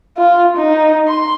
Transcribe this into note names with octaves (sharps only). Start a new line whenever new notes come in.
F4
D#4
C6